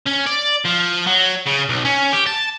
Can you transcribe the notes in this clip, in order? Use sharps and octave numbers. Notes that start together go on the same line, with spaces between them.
C#4
D5
F3
F#3
C#3
B1
C#4
G4
A5